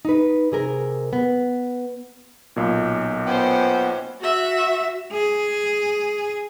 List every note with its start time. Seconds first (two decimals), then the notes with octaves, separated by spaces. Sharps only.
0.05 D#4 B4
0.52 C3 G#4 A#4
1.13 B3
2.56 B1 A#2
3.26 B3 C#4 C5 G5
4.21 F#4 E5
5.13 G#4